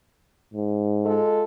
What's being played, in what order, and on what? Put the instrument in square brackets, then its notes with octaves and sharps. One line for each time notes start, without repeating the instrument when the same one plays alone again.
[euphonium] G#2
[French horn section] G#3 F4 A4